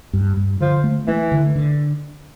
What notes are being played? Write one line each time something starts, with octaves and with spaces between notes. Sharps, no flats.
G2
G2
D3 F3
A3
E3 A3
D3
D3